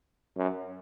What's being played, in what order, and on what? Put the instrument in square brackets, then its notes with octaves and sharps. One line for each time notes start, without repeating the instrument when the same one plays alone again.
[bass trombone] F#2